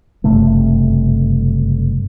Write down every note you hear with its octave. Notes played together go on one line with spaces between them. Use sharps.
F#1 G2 C3 A3